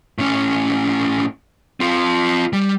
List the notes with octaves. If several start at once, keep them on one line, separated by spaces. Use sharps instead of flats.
A2 C#4
C4 F4
G3